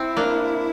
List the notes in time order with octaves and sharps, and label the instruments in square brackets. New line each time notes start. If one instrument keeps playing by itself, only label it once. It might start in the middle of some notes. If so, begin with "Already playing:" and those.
Already playing: [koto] C4 [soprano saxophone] E4
[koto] A#3 D4